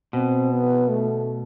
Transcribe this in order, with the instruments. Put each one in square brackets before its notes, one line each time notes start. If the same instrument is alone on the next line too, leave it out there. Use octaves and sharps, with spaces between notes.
[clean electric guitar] B2 [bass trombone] C4
[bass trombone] B3
A3